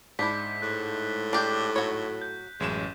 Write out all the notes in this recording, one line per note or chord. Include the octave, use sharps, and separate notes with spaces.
G#2 D4 E4 G6 B6
A2 F#6
D4 G4
F#3 C#5
G6
A1 F#2 G#3 E7